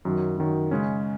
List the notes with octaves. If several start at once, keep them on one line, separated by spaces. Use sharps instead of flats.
F#2 D#3 F#3
F#2 D#3 F#3
C#3 G#3 C#4